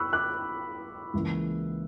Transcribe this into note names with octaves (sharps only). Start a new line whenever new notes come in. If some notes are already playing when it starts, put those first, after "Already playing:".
Already playing: B3 B5 C#6 E6 F#6
D6 F#6
C#2 C#3 E3 A#3